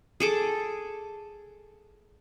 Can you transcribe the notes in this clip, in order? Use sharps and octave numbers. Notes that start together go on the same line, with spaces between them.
G#4 A4 D6